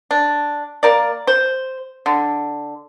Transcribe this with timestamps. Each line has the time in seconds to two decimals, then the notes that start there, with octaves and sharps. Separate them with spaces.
0.11 D4
0.83 A#3 A#4 D5
1.27 C5
2.06 D3